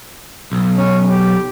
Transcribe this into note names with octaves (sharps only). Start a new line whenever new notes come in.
B1
C#4
G4